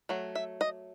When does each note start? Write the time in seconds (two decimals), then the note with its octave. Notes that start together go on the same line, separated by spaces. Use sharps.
0.09 F#3 A3
0.35 E5
0.61 D#5